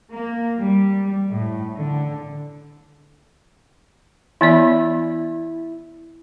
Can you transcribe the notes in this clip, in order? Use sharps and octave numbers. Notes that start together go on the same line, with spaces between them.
A#3
G3
A2
D3
E3 B3 E4 D5